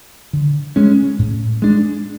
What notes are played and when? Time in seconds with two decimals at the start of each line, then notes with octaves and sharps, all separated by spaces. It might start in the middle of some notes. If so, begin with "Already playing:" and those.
0.33 D3
0.76 G#3 C#4
1.19 A2
1.62 G#3 D4